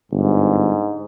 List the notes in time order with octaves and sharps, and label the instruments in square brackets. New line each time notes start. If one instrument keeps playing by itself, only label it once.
[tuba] G1 [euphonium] G#2